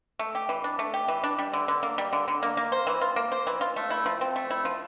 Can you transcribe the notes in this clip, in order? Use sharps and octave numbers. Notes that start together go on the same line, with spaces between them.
A3
G4
E3
D4
A3
G4
E3
D4
G3
D3
D3
A#3
G3
D3
D3
A#3
A#3
C5
E3
F4
A#3
C5
E3
F4
A3
E4
F3
C4
A3
E4
F3